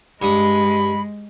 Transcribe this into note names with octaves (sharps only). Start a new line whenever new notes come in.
G2 G#3 B5 D#6